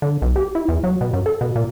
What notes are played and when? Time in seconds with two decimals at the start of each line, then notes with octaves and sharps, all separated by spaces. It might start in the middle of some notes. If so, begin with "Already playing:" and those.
0.02 D3
0.22 B1
0.36 G4
0.55 E4
0.68 E2
0.83 F#3
1.01 B2
1.13 F#2
1.26 A4
1.41 B2
1.56 A#2